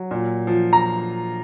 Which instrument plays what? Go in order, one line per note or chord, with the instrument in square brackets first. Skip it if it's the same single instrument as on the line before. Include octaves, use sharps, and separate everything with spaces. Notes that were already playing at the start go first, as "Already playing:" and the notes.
Already playing: [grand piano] F#3
A#2
F3
A#5